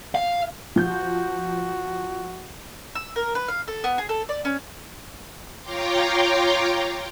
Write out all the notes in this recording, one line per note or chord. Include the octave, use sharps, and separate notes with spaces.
F5
F3 F#4 G6
E6
A#4
B4
F5
A4
B3
G#4
A4
D5
C#4
F4 C#5 G5 A#5 C6 D6